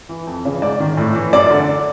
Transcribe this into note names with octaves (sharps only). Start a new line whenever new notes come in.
E3
F2
C#3 E3
G#2 D5
D#3
A2
E3
F#2 D5
D3